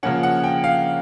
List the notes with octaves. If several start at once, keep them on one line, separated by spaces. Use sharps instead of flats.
C#3 F3 A#3 C#4 F#5
F#5
G5
F5